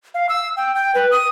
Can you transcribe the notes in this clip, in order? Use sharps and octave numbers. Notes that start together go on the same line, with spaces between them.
F5
E6
G5
G5
B4
D#6